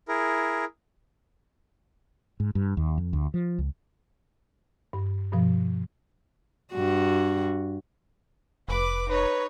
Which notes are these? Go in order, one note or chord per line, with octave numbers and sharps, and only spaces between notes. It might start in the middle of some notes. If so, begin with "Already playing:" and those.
E4 G#4 A#4
G#2
G2
D#2
F2
D2
F3
C#2
G2
G2 B2 F3
G2 F#4
F1 B4 D6
D#4 B4 C#5